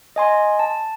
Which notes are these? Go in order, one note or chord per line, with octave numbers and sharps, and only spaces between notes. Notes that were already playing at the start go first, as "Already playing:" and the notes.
D#5 G#5 C6
A5